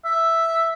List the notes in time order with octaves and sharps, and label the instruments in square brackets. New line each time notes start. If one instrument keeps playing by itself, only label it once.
[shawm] E5